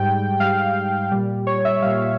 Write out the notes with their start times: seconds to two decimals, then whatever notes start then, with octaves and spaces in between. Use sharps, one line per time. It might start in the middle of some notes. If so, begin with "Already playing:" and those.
Already playing: G#2 G3 G5
0.40 G#2 G3 F5
1.12 A#2 G3
1.47 C#5
1.65 E5
1.82 A#2 G3 F5